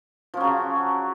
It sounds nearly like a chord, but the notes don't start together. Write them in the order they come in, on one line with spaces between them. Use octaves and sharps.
F3 C#4 F#3 C#3